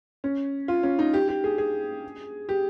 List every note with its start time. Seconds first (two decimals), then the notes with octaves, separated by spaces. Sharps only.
0.24 C#4
0.68 F4
0.83 C#4
0.99 D#4
1.14 G4
1.28 G4
1.44 G#4
1.58 G#4
2.49 G4